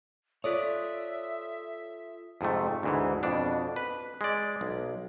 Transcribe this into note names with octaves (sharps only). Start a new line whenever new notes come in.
F4 A4 C#5 D5 E5 D#6
F2 G#2 C3 A3
D2 G#2 E3
F2 B2 D4
B4
G#3 D5
B1